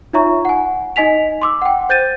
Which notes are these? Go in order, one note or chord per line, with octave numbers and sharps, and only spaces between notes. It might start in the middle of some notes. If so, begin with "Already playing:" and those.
D#4 F4 C#5 E5 A#5 C#6
F#5 G#5
D#4 D#5 G#5 B6 F7
C6 D6 E6
F#5 G5
C5 G6 A6 D#7